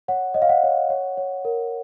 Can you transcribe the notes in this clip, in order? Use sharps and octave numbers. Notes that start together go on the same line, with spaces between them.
C#5 F#5
C#5 D#5
F5
F#5
C#5
C#5
C#5
A#4